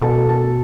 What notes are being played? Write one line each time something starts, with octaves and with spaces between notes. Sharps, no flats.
B2 A4
A4